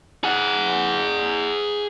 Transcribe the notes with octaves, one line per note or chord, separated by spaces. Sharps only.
G#4 F#5